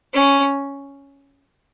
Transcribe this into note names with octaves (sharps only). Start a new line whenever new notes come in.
C#4